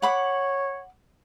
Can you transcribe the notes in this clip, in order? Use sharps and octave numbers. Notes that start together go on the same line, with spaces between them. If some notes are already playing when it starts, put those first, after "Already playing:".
C#5 F#5 B5 D6